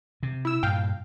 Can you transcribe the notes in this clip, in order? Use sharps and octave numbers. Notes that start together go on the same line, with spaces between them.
C3
E4 E6
G2 A#2 F5 G5